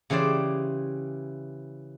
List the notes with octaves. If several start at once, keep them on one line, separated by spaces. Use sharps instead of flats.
C#3 E3 G4 C5 D5